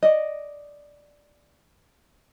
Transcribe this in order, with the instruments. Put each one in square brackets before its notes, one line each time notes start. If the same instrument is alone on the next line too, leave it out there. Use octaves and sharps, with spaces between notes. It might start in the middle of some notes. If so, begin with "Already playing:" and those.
[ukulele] D5 D#5